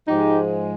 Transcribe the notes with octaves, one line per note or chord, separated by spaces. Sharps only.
G#2 F3 G#3 D#4 G4